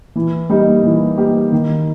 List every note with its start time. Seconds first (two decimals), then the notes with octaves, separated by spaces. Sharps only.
0.16 E3
0.49 G3 A#3 D#4 G4
0.84 E3
1.18 G3 A#3 D#4 G4
1.52 D#3